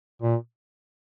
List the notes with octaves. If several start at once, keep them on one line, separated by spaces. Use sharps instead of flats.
A#2